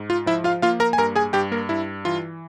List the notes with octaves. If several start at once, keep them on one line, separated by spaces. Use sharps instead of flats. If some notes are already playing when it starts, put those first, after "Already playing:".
Already playing: G#2
F4
F3 E4 E5
F4 F5
A#3 F4 F5
A#4 A#5
G#5
G2 A#4 A#5
G#4 G#5
G2 G4 G5
A#3 A#4
G2 E4
E3 F4